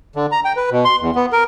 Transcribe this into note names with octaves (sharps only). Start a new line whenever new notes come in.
D3
A#5
G5
B4
B2
C6
E2
B3
A#4